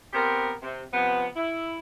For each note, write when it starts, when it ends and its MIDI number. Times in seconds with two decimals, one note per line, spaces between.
0.13 0.54 59
0.13 0.54 60
0.13 0.54 67
0.13 0.54 70
0.63 0.82 48
0.93 1.28 48
0.93 1.28 53
0.93 1.28 59
1.36 1.78 64